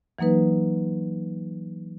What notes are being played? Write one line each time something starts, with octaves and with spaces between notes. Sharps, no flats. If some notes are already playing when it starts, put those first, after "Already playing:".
E3 F#3 A#3 D#4 B4